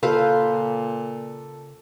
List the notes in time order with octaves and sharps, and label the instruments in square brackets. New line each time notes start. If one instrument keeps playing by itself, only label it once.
[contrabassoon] A#2 [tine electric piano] C#3 [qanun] F4 B4 C5 [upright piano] A4